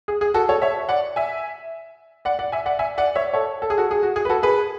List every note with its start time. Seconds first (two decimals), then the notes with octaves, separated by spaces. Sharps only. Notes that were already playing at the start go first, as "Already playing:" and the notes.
0.08 G#4
0.21 G#4
0.34 F#4 A4
0.49 A4 C#5
0.62 C#5 E5
0.89 D5 F#5
1.16 E5 G#5
2.25 D5 F#5
2.39 D5 F#5
2.52 E5 G#5
2.66 D5 F#5
2.79 E5 G#5
2.98 D5 F#5
3.16 C#5 E5
3.34 A4 C#5
3.62 A4
3.70 G#4
3.78 F#4 A4
3.91 G#4
4.03 F#4
4.16 G#4
4.25 B4
4.29 F#4 A4
4.43 G#4 B4